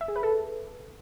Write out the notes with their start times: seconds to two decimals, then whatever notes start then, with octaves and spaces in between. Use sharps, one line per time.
0.01 E5
0.08 G#4
0.16 B4
0.23 A4